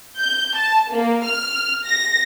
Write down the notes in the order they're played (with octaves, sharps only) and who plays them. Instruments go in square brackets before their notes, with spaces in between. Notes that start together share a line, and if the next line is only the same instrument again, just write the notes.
[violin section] G6
A5
A#3
F6
A#6